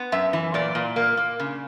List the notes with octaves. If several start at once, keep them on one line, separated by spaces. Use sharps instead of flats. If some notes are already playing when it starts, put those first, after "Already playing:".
Already playing: B3
F#2 E5
E3
A#2 D5
A#2
A#3
A#3
C#3